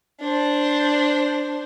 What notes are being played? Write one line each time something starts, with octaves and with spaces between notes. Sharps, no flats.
D4 C5